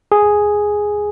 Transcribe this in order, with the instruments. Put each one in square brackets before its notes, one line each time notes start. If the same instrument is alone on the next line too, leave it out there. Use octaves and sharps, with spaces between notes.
[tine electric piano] G#4